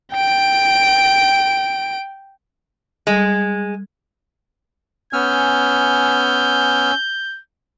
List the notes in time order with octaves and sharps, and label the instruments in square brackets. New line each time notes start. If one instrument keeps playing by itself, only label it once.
[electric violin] G5 D7
[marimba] G3 [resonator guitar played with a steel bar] G#3
[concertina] B3 F6 [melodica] C#4 G#5 E6 [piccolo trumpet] G6